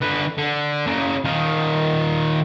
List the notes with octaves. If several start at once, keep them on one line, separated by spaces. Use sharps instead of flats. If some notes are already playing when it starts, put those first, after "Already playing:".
D3 B4
D3
C#3 A#3
D#3 F4